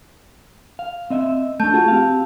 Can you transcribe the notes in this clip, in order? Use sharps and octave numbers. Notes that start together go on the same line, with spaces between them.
F5
C4 D#5 E5
A3 D4 A5 G6
F4 F#4 G#4
C4 G4 F5